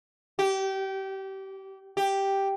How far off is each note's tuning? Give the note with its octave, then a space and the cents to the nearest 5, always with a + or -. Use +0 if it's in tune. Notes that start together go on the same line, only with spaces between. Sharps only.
G4 -25
G4 +0